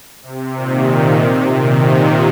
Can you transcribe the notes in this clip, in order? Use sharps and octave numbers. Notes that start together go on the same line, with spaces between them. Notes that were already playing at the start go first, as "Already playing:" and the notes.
C3
A#2 D#3
C3 F3
A#2 D#3
C3